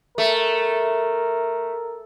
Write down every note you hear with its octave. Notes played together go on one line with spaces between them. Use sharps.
A3 A#4